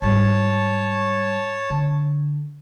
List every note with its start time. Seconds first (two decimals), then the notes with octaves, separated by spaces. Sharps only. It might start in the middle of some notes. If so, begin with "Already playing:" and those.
0.02 G#2 G3 C#5 A5
1.70 D3